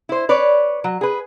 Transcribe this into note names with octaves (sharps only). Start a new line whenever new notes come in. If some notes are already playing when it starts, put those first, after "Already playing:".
E4 C5
B4 C#5 D5
F#3
G#4 B4